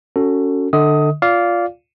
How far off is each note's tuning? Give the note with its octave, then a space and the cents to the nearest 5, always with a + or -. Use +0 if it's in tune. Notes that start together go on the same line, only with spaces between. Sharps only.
C#4 +15 F#4 +0 A4 +25
D3 +20 D#5 +35 D#6 +15
F4 +0 D5 -20 F5 +0